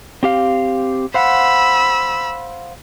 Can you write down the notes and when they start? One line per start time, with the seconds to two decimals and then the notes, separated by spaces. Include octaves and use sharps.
0.23 C4 G4 F5
1.14 C5 F5 F#5 B5 E6